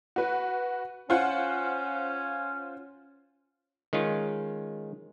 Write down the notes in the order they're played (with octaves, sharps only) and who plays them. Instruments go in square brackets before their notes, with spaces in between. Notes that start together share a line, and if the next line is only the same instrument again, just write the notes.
[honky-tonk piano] F#4 B4
[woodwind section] C#4 [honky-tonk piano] F4 C5 F#5
[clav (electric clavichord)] D#3 G#3 C#4 F4